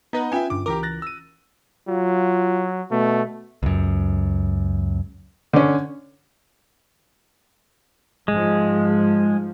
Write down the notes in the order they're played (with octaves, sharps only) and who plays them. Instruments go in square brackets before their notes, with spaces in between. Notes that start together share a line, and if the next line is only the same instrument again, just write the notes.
[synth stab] B3 B4 F#5 [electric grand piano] D#4 D#5 [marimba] A#5
[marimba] C#4 F4 [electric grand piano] E5 G5 G#5
[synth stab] G2 D3 [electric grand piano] D6
[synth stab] C#2 E3 A#4 [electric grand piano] G4 A#5 D6
[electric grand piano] F#6 A6 A#6
E6 D#7
[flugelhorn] F#3 [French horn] F4
[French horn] B2 [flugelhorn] A3
[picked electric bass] C#2 F#2
[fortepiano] D3 C#4
[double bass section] G#2 F3 [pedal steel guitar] G#3